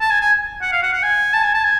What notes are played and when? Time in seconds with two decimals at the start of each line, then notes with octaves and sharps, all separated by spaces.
0.01 A5
0.11 G#5
0.21 G#5
0.62 F#5
0.72 F5
0.83 F#5
0.93 F#5
1.03 G#5
1.34 A5
1.44 G#5
1.54 A5
1.64 G#5